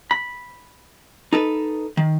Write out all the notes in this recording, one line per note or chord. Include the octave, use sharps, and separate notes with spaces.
B5
D#4 A4 B4
D#3